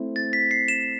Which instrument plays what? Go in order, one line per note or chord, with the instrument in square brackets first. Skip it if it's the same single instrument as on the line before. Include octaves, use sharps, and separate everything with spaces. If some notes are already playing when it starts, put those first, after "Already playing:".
Already playing: [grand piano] A3 C4 E4 E5
[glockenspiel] A6
B6
C7
E7